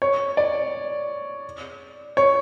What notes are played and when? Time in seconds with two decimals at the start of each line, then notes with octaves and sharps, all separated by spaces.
0.02 C#5
0.37 D5
2.17 C#5